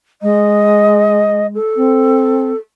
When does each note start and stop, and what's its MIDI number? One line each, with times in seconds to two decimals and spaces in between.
0.22 1.57 56
0.22 1.47 75
1.55 2.57 69
1.75 2.51 60